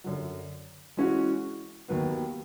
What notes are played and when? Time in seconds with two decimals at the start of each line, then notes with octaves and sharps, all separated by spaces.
0.04 F#2 D3 F#3
0.97 E3 G#3 C#4 F#4
1.88 D#2 D#3 F#3 B3